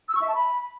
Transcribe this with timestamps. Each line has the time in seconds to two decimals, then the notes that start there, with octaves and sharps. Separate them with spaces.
0.09 E6
0.15 C#6
0.21 E5
0.28 A5
0.34 B5